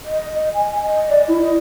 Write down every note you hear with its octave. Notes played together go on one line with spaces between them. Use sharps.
D#5
D#5
G#5
D#5
D5
E4
D#5